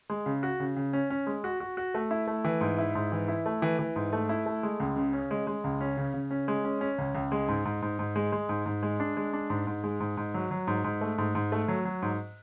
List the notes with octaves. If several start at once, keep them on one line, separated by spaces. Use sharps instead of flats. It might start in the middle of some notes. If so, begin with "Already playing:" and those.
G#3
C#3
F#4
C#3
C#3
C#4
C#4
G#3
F#4
F#4
F#4
A3
E4
A3
E3
G#2
E4
G#2
E3
E4
A3
E3
E3
G#2
A3
E4
A3
G#3
C#2
C#3
C#4
G#3
G#3
C#2
C#4
C#3
C#3
C#4
G#3
C#4
C#4
C#2
C#2
G#3
G#2
G#2
G#2
G#2
G#3
G#3
G#2
G#2
G#3
D4
G#3
D4
G#2
G#2
G#3
G#2
G#2
F#3
F#3
G#2
G#2
A3
G#2
G#2
A3
F#3
F#3
G#2